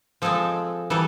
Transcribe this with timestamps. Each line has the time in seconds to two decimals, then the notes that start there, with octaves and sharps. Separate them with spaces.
0.22 F3 G#3 C4 A4
0.90 E3 G3 A4